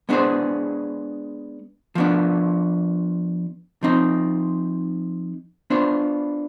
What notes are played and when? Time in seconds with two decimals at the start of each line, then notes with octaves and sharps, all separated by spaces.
0.09 G#3 B3 D4 G#4 C5
1.95 F3 B3 D4
3.83 F3 C4 D#4
5.70 B3 D4 F4 C5